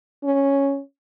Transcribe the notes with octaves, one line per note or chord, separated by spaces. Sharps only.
C#4